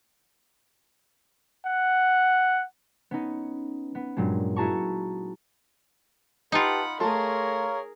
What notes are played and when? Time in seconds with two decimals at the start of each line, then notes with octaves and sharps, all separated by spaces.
1.67 F#5
3.11 B3 C#4 D#4
3.95 B3
4.17 G2 A#2 F#3 G#3
4.56 E4 F#4 G#4 A5 A#5 C#6
6.52 D#4 F4 G4 B4 F#5 A5 B5
7.00 A3 G#4 A#4 C#5 F5 A5 A#5 C6